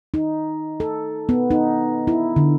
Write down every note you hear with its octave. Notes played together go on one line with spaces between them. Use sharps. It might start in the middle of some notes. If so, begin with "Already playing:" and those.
D#4
A4
B3
D#4
E4
D3